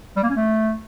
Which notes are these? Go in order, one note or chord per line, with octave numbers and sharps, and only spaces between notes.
G3
A#3
C#4
A3